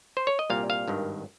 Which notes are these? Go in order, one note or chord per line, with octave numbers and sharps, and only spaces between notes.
C5
C#5
D#5
C2 A#2 G3 A#3 F5
F5
G#1 G2 D#3